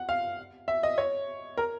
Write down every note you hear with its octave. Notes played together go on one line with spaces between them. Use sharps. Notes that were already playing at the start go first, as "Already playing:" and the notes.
Already playing: F#5
F5
E5
D#5
C#5
A#4